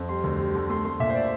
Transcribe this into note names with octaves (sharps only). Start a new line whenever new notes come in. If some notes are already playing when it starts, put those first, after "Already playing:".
Already playing: F2
G3 C6
D2
G3
D3
A3 C6
A3 C6
A#2 E5
C5
D5